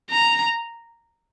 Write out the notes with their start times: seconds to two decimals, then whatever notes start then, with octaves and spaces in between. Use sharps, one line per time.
0.11 A#5